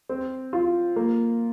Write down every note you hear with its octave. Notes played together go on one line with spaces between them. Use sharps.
C4
F4
A#3